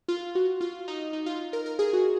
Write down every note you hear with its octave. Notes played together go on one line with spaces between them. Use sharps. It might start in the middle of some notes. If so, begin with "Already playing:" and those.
F4
F#4
F4
D#4
D#4
F4
A#4
A#4
G#4
F#4